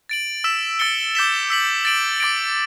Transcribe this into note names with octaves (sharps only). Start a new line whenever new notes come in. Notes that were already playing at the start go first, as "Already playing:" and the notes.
A6 D7 F#7
E6 B6 E7
E6 A6 C#7 G7
D6 G6 B6 E7 G7
E6 B6 F#7
A6 D7 F#7
D6 A6 D7